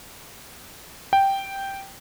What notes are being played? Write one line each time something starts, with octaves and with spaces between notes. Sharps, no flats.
G5